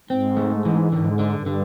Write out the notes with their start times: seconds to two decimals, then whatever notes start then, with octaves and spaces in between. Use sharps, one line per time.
0.10 G#2 C4
0.37 A3
0.65 E3
0.92 G#2 D3
1.19 D3
1.33 G2
1.46 D3